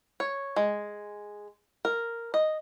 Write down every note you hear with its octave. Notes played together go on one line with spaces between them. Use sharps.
C#5
G#3
A#4
D#5